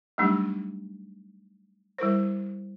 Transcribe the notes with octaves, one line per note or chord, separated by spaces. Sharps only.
F#3 G3 A3 D4 D#4 G4
G3 E4 A#4 C5